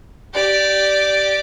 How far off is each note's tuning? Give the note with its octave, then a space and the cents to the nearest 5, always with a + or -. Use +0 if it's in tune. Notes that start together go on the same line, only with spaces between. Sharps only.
G4 -15 D5 +0